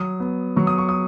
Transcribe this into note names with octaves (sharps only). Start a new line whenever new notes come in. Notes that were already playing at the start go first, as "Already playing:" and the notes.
Already playing: F#3 D#6
B3
F#3 C#6
D#6
C#6
D#6